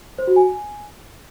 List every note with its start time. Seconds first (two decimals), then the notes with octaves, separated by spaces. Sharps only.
0.18 C5
0.27 F#4
0.36 G#5